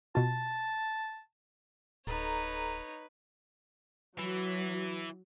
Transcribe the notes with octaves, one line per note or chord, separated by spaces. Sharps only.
B2 F4 A5
D1 D#4 A4 B4 C#5 A#5
E3 F#3